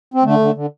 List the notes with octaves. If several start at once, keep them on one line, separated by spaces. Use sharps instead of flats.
C4
D3 A3
D3
D3